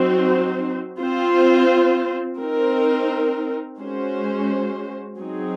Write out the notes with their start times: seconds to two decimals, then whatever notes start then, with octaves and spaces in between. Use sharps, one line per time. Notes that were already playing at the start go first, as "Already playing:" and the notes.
Already playing: F#3 C4 D#4 F#4 C5
1.00 C4 F4 C5
2.40 C4 D#4 A#4
3.79 G#3 C#4 F#4 C5
5.20 F#3 C4 D#4 G#4